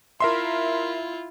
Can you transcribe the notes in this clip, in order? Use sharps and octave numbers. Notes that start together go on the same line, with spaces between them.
E4 F4 A#4 E5 C6